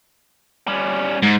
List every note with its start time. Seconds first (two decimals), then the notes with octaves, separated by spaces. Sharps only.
0.67 G3 C#4
1.22 G#2